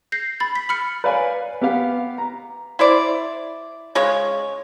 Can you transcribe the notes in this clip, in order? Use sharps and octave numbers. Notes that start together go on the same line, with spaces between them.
G6 A#6 C7
B5 A6
B6
B5 F6 C#7
B4 C#5 D5 F5 G#5
B3 G4 F5
A#5
E4 C5 D5
C#3 G#3 C#5